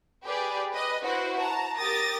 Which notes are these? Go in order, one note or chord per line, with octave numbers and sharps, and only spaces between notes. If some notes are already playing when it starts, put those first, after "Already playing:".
G4 G#4 B4 D5
B4 D#5
E4 F#4 B4 C5
A5 A#5
G4 A#4 D#6 A6 A#6